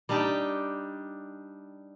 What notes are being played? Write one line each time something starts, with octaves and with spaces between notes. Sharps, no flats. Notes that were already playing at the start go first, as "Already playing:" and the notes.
G3 D4 D#4 G4 G5